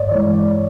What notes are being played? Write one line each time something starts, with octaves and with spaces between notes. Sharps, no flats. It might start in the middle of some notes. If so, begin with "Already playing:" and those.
Already playing: G2 C#5 D5
E3 G#3 C#5
D5